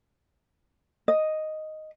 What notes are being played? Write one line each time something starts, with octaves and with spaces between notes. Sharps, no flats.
D#5